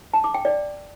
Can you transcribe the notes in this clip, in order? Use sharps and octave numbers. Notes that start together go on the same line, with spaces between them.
A5
D6
G5
D5